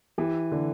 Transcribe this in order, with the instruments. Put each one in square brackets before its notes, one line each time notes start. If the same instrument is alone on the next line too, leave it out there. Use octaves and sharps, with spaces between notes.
[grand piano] E3 [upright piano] G4
[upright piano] D3